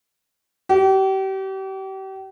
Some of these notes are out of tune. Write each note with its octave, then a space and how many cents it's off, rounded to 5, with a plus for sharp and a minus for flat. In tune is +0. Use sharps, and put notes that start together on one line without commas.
G4 -35